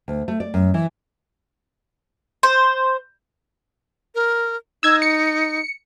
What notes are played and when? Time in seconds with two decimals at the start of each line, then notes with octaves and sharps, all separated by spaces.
0.08 D2
0.28 A3
0.40 D5
0.54 F#2
0.74 E3
2.43 C5
4.15 A#4
4.83 D#4 E6 G#6
5.02 C#7